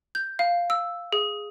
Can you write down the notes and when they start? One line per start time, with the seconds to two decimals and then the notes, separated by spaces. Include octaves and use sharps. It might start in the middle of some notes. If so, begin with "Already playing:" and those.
0.15 G6
0.39 F5
0.70 E6
1.13 G#4